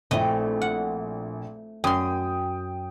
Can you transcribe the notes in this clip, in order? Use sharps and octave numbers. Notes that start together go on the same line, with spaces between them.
A#1 A3 C4 E4 D#5
F#5
F#2 G5 C6 D#6